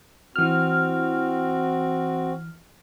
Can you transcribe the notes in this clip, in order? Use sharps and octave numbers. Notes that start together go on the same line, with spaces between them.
E3 C4 F#4 F6